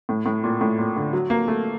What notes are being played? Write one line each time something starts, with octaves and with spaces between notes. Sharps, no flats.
A2
A2
A#2
A2
A#2
D3
F#3
A#3
A3